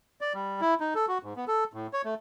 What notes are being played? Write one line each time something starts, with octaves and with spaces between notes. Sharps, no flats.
D5
G3
E4
D#4
A4
F#4
G#2
B3
A4
A2
C#5
A3